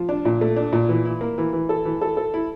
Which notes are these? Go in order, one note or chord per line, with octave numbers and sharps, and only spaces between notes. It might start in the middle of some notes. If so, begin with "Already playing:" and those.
Already playing: F3
D4
A#2
A3
D4
A#2
E3
E4
A#3
E3
E3
A4
E3
A4
A4
E4